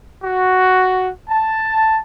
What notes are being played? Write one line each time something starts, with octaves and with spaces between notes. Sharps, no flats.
F#4
A5